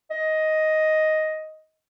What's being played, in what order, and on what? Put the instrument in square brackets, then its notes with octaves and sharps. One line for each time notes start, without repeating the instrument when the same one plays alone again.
[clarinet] D#5